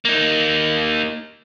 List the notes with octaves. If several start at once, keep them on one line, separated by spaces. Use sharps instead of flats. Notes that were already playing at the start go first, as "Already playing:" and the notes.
A#3 D#4